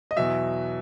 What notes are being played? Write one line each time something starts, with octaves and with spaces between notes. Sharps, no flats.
D#5
E2 B2 F#3 E5